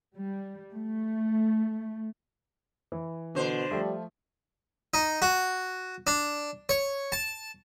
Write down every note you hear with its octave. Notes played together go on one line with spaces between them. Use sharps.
G3
A3
E3
B2 D3 C5
F3 G3 A3 F4
D#4
F#4
D4
C#5
A5